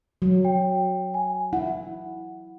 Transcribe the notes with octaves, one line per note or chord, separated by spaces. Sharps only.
F#3
G5
G#5
E4 F#5